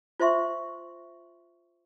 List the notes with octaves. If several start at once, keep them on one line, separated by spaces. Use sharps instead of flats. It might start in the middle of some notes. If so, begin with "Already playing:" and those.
F4 C5 E5 C6 C#6